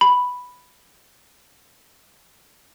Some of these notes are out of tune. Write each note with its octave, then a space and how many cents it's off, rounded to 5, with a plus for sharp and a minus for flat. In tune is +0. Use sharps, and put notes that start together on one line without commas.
B5 +0